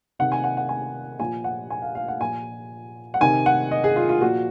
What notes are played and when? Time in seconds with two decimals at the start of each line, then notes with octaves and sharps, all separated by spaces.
0.19 C3 D#3 F#5
0.32 G#5
0.44 F#5
0.57 F#5
0.69 G#5
1.19 A#2 F3 G#5
1.44 F#5
1.70 G#5
1.82 F5
1.95 F5
2.08 F#5
2.20 A#2 F3 G#5
3.14 F#5
3.21 C3 D#3 G#5
3.46 F#5
3.71 D#5
3.84 G#4
3.96 F4
4.09 F4
4.21 A#2 F3 F#4